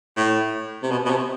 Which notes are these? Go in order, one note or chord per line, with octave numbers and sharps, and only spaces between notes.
A2
C3
B2
B2
C3